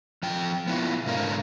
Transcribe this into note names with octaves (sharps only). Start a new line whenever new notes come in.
F3 G5
B3 E4 F4
G#2 B2 D3 A#4 F5